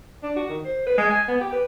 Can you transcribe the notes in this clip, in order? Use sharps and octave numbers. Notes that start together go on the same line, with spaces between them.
D4
F#4
D#3
C5
B4
G#3
G#5
B3
G4
B4